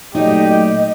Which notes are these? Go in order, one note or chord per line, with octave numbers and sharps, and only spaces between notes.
A#2 F#3 A3 D#4 G4 D5 D#5